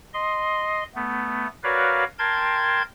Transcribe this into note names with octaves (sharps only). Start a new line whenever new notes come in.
D#5 C6
A3 B3
F#4 A#4 B4 C#5 D5 F5
A#4 G5 A5 C6 G#6